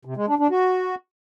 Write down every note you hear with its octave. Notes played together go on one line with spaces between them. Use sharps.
C3
G#3
D4
D4
F#4